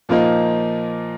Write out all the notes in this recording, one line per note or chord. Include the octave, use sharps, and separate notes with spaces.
A#2 F3 A#3 D#4